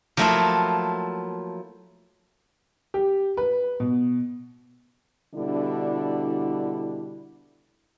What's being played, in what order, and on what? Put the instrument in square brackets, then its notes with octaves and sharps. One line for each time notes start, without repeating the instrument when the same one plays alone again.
[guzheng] F3 F#3 A3 A#3 E4 F4
[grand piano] G4
B4
B2
[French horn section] B2 D3 G3 D4 E4